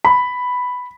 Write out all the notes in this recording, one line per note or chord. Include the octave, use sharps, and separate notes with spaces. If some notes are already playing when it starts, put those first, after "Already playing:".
B5